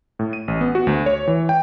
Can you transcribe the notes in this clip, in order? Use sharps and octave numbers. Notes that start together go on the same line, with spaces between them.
A2
D#7
A1
B3
F#4
D2
C#5
E3
G5